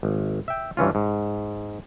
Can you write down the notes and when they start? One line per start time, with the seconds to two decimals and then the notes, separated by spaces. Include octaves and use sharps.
0.03 G#1
0.48 E5 G5
0.77 G2 E3 C#4 F4
0.95 G#2